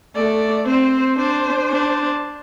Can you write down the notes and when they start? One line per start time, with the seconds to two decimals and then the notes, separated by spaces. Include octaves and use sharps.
0.16 A3 D5
0.67 C4 C5
1.18 D4 C5
1.70 D4